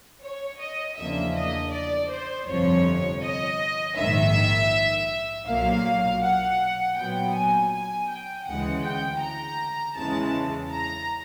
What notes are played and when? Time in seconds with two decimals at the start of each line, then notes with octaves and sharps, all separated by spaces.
0.23 C#5
0.60 D#5
0.98 E2 C#3 F3 A#3 D4 E5
1.35 D#5
1.72 D5
2.10 C5
2.48 G1 F2 C3 F3 C#5
3.23 D#5
3.97 A#1 G#2 D#3 E5
5.47 B1 A#2 F#3 A#3 F5
6.23 F#5
6.97 A#2 F#3 B3 G5
7.34 G#5
7.72 G#5
8.10 G5
8.47 D2 C#3 E3 G#3 F#5
8.85 G5
9.21 A#5
9.97 E2 C#3 E3 G#3 A5
10.72 A#5